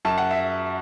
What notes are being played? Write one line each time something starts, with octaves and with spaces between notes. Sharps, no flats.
F#2 A5
F#5
E5